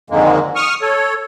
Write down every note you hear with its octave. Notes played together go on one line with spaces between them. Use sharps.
F2 G#2 D3 D#3 G#3 A#3
C#6 D#6 F6
A4 C#5